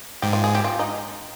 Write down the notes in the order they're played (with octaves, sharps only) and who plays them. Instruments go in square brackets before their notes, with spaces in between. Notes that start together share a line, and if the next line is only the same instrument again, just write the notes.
[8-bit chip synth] G#2 [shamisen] G4
[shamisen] F4
G#4
G4
F4
D#4